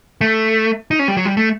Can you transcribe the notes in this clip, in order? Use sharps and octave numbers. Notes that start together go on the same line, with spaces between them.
A3
D#4
C#4
G3
F#3
G3
A3